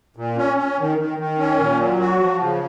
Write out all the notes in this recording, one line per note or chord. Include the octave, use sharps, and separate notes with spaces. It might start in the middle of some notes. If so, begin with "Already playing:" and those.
A#2
C#4
C#4
D#3
D#3
D#3
C#4
A#2
F#3
F#4
F3
C#3